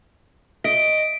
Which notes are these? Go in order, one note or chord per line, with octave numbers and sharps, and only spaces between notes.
D#5 B6 D7